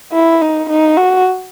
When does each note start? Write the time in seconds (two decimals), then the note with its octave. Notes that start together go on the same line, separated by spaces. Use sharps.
0.13 E4
0.41 D#4
0.69 D#4
0.97 F#4